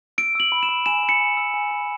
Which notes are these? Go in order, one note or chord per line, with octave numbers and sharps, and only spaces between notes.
E6 D7
E6 F#7
B5
E7
B5
G#5 E7
B5
C#7
G#5
E6
G#5
B5